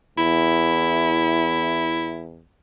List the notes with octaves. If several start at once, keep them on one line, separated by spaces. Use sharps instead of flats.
E2 E4